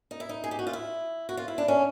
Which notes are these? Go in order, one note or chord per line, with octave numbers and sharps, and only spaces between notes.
D#4
E4
D#4
G#4
G4
F#4
F4
E4
F#4
F4
E4
D4
C#4